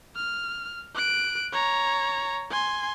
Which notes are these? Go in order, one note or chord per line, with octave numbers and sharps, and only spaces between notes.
F6
F#6 D7
C#5 A#5
G#5 C6